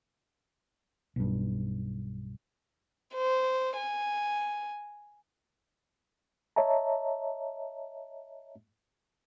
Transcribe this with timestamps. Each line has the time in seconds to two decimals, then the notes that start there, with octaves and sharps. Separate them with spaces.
1.16 B1 G2
3.14 C5
3.77 G#5
6.56 C#5 D#5 E5 A5 A#5